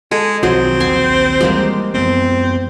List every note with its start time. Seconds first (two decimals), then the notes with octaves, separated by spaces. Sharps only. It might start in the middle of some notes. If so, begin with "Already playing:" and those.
0.11 G#3 A4
0.43 B1 D#3 F3 F#3 C4 G#4 D#5
0.80 A#1 D#2 G#5 C6
1.41 E3 G3 G#3 A#3 G4
1.94 F#2 F3 B3 C4